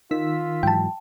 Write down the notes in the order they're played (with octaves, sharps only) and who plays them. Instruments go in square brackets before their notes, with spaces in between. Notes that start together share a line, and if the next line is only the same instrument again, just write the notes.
[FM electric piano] D#3 E6 B6 [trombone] F4
[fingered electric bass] G#2 E3 F#3 [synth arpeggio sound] G5 A5